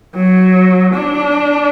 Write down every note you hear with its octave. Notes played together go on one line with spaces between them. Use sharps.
F#3
D4